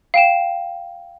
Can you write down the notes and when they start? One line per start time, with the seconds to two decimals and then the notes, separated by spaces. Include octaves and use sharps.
0.14 F5 G5 E7